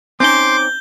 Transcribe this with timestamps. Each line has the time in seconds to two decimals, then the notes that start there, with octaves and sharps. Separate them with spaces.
0.20 C4 C#4 D#4 C6 D6 G6 G7